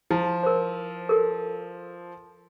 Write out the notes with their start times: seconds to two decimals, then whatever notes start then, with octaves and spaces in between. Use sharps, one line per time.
0.11 F3 E4
0.43 A#4 C5
1.09 A4 A#4